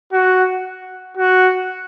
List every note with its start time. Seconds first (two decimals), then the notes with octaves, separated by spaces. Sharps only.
0.13 F#4
1.17 F#4